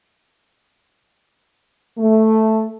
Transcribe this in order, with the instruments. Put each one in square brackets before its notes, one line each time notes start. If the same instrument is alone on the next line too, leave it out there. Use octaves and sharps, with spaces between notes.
[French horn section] A3